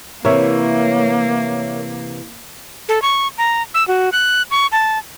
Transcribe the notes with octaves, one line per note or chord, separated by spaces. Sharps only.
C3 E3 A#3 A#4 C#5 E5
A4
C#6
A#5
E6
F#4
F#6
C#6
A5